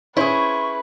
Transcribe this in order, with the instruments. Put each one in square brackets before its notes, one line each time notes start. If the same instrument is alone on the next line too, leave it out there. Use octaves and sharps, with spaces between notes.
[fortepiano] C#4 C5 [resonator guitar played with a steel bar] E4 G#4 [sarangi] B4 [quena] C#6